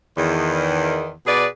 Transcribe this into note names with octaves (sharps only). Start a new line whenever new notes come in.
E2 D#3
B2 G#4 B4 D5